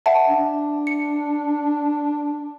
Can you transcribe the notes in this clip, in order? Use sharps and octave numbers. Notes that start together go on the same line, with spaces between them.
E5 F#5 A5
D4
C#7